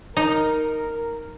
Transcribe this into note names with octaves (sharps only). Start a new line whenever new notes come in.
D#4 A#4